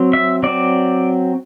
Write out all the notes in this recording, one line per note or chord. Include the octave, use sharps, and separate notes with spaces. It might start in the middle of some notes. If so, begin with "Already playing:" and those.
Already playing: F#3 C4
E5
F#3 C4 D5